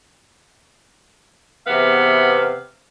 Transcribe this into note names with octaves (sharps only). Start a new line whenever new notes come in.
E2 C3 B3 B4 F5